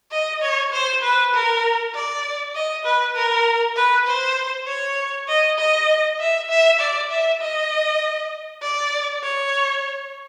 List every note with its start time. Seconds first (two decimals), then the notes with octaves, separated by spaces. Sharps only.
0.12 D#5
0.42 C#5
0.73 C5
1.03 B4
1.33 A#4
1.94 D5
2.55 D#5
2.85 B4
3.16 A#4
3.76 B4
4.07 C5
4.67 C#5
5.28 D#5
5.58 D#5
6.20 E5
6.50 E5
6.80 D5
7.10 E5
7.41 D#5
8.62 D5
9.23 C#5